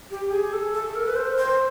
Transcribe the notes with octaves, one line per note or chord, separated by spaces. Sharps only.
G4
G#4
A4
A4
A#4
B4
C5
C5